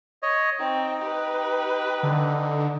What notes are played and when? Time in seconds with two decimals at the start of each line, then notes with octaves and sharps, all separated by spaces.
0.23 C#5 D#5
0.59 C4 D#4 G5
1.02 G4 B4
2.03 D3